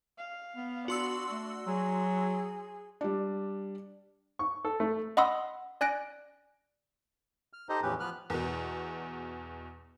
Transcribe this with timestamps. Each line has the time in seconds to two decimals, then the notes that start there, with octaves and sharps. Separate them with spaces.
0.18 F5
0.57 B3
0.88 D4 F#4 C6 E6
1.31 A3
1.67 F#3 G#4
3.01 G3 D4
4.39 C#6
4.65 A4
4.80 A3
5.17 D#5 F#5 B5 C6 D#6 E6
5.81 D5 G#5 F#6 A#6 D7
7.53 F6
7.69 D#4 G4 A4 C5 D#5 A#5
7.83 E2 A2 F3 C#4 G4 B4
8.00 F3 B3 B4 F6 F#6
8.30 E2 B2